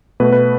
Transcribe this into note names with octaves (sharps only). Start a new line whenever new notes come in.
B2 A3 B4
B4